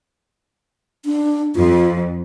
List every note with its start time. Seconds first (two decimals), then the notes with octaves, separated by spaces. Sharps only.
1.05 D4
1.56 F2 F4